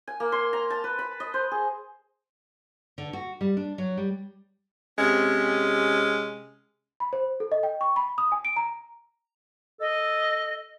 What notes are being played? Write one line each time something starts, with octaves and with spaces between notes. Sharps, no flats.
G#5
A#3
C6
A#5
A5
B4
B5
D#5
C5
G#4
D3
F#4
G3
D4
F#3
G3
C3 G#3 C4 C#4
B5
C5
A4
D#5
G5
C#6
B5
D#6
G#5
D7
A#5
A4 D#5